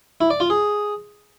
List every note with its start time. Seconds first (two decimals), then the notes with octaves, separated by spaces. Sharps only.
0.21 E4
0.30 D5
0.40 F4
0.50 G#4